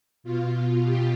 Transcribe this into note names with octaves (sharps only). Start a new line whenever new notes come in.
B2 F4
G4